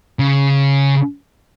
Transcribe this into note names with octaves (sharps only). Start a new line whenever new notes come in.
C#3